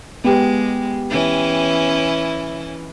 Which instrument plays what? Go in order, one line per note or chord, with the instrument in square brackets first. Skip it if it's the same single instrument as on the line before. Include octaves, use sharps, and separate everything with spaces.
[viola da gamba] G#3 [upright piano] B3 G4
[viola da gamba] E3 C#4 E4